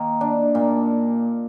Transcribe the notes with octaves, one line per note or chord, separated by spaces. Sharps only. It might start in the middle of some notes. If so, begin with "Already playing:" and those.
Already playing: D#3 A#3
D4
A#2